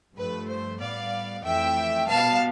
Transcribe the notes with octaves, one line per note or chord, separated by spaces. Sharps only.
G2 F3 A3 B4
C5
A2 G3 B3 D5 F5
F2 E3 A3 E5 G5
B2 G3 B3 F5 A5